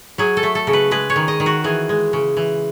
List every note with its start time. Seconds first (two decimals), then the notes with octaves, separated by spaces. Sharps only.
0.18 F#3 G#4
0.37 A4
0.43 A3
0.55 A4
0.67 C#3
0.73 B4
0.91 G#3 B4
1.10 C#5
1.16 D#3
1.28 D#5
1.40 D#3
1.46 F#4
1.64 E3 G#4
1.89 G#3
2.13 C#3
2.37 E3